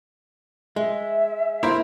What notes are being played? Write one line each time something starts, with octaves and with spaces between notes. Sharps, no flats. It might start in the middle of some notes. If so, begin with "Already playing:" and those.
G#3 E5
A#3 E4 C5